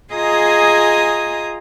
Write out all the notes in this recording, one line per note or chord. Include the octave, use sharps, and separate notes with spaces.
F4 G#4 D#5 G#5 A#5 D#6